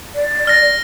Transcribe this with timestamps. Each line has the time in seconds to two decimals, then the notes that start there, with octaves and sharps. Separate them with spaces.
0.15 D5
0.47 F6 A#6